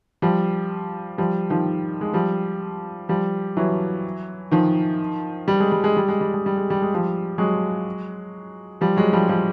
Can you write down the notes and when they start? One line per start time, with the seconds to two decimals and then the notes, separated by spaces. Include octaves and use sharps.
0.22 F3 G3
1.18 F3 G3
1.50 D#3 F3
2.01 G#3
2.13 F3 G3
3.09 F3 G3
3.57 E3 F#3
4.51 D#3 F3
5.48 G3
5.60 G#3
5.72 G3
5.84 G#3
5.97 G3
6.08 G#3
6.21 G3
6.34 G#3
6.46 G3
6.57 G#3
6.70 G3
6.82 G#3
6.94 F3 G3
7.38 F#3 G#3
8.81 F3 G3
8.97 F#3 G#3
9.13 F3 G3
9.28 F3 G3